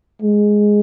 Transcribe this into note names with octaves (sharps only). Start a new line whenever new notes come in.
G#3